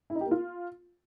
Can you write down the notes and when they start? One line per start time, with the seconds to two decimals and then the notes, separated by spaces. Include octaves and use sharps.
0.10 E4
0.15 D#4
0.21 G4
0.26 A#3
0.31 F4